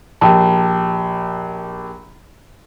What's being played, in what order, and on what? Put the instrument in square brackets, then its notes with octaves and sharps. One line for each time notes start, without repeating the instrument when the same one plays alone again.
[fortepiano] A#1 [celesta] G4 G5 A5